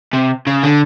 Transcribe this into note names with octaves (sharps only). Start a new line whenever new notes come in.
C3
C#3
D3